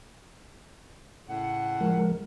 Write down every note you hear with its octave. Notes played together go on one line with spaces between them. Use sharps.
A2 C#3 F#5
F3 G#3 A#4